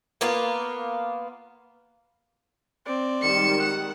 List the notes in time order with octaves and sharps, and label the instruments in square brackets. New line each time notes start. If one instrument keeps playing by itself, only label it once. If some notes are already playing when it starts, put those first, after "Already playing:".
[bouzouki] A#3 B3 F4
[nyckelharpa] C4 D5
[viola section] D#3 G3 G#3 [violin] C#7 E7
[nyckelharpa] F#5